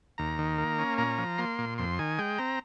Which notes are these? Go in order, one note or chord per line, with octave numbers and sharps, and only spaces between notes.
D#2 A#5
D#3
A#3
C#4
A#2 A#5
F3
A#3 C6
A#2
F2 C6
D#3 G#5
G#3 G5
C4 A#5